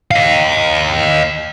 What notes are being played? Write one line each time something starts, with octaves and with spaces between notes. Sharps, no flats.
D#5 F5